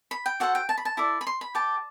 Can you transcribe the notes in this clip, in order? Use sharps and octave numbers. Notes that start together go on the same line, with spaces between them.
B5
G5
F#4 A4 C5 F#5
G5
A5
B5
A5
E4 A4 D5
B5
C6
B5
G4 D5 A5